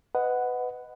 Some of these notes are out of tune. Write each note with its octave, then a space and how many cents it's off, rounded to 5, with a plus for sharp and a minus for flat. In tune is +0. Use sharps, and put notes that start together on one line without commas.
B4 +15 D#5 +0 F#5 +0